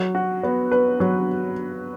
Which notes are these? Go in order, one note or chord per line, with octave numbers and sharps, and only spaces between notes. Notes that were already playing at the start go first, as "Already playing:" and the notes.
Already playing: F#3
F#4
B3
B4
F#3